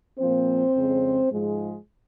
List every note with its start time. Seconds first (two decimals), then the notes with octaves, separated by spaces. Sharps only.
0.19 A#2 F3 A#3 C4 C5
0.75 F2 C#3 G#3
1.31 G#2 F3 G#3